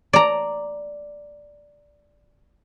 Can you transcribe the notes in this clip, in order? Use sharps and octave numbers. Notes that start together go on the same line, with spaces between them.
D5 A#5